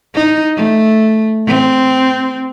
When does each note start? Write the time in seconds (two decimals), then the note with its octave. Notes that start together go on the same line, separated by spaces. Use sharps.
0.15 D#4
0.56 A3
1.47 C4